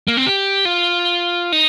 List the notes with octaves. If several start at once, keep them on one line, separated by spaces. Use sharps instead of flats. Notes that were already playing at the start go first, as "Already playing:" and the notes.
A#3
C4
G4
F4
D#4